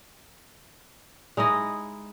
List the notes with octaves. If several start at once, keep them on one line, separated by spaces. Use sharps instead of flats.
G#3 D#4 E4 D#5